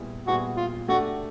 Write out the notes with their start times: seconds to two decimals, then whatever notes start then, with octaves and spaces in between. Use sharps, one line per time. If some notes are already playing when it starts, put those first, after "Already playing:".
Already playing: A#2 G3 B3 E4 G#4
0.27 A#2 G3 B3 E4 F#4 G#4
0.57 F4
0.88 A3 D4 F#4 G4